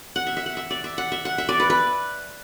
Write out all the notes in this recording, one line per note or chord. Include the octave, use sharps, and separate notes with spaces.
F#5
E5
E5
F#5
E5
D5
E5
F#5
E5
F#5
E5
D5
B4
B4